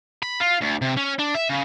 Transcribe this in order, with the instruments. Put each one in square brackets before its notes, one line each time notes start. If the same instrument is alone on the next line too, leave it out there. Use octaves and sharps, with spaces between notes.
[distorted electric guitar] B5
F4
D2
C3
C#4
D4
E5
C#3